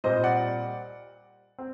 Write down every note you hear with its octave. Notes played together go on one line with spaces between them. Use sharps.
A#2 G3 C4 C5 D#5
D5 F#5
C4